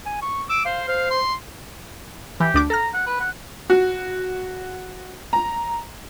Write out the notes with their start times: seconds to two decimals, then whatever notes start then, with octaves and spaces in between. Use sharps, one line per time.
0.06 G#5
0.22 C#6
0.49 D6 E6
0.65 C5 F5
0.88 C5 F5
1.11 C6
2.40 E3 G4
2.54 D2 D4 D6
2.70 A4 A#5 F6
2.94 F#5
3.07 B4
3.20 F#5
3.70 F#4
5.33 A#5